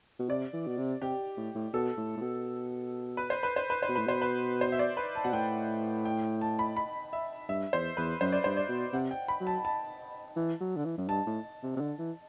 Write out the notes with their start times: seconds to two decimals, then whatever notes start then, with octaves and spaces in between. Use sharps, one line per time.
0.19 B2
0.29 C3 D5
0.53 E3
0.67 B2
0.78 C3
1.01 C3 G4
1.37 A2
1.55 A2
1.74 B2 A4
1.97 A2
2.17 A2
2.21 B2
3.17 B4
3.30 C5
3.43 B4
3.56 C5
3.70 B4
3.83 C5
3.89 B2
3.95 A2 B4
4.07 B2 C5
4.22 B4
4.61 C5
4.72 E5
4.79 D5
4.97 B4
5.15 A5
5.24 B2 F#5
5.33 A2 G5
6.05 G5
6.41 A5
6.59 B5
6.77 B5
7.13 E5
7.49 G2 E5
7.73 E2 C5
7.97 E2 B4
8.21 F#2 C5
8.32 D5
8.44 G2 C5
8.57 D5
8.69 B2
8.93 C3 F#5
9.11 G5
9.28 B5
9.41 F#3
9.47 A5
9.65 A5
10.36 E3
10.61 F#3
10.76 D3
10.85 E3
10.98 F#2
11.08 G2 A5
11.26 A2
11.63 C3
11.76 C3
11.81 D3
11.99 E3